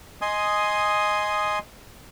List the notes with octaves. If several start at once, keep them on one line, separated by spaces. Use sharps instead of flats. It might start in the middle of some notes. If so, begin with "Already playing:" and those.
D#5 G#5 C6 D#6